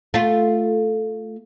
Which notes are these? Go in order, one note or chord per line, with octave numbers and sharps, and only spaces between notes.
A3 F4